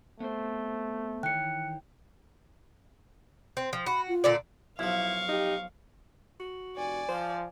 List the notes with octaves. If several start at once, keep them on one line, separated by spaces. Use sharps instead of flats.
A3 B3 C4 C5
D#3 E3 C#5 G5 F#6 C#7
C4
F3
F#4 B5
F4
A#2 D3 D5
B1 F3 E4 F5 C#6
D#4 G4
F#4
F1 D5 G#5
F3 C5